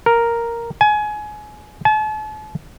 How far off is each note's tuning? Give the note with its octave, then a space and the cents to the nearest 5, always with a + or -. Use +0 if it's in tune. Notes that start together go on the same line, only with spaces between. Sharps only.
A#4 +0
G#5 +25
A5 -40